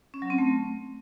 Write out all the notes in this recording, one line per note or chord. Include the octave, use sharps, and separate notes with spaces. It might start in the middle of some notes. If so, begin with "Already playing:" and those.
C#4
F#3
C4
A3